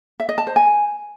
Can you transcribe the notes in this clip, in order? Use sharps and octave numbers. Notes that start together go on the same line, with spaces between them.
E5
D#5
A5
C5
G#5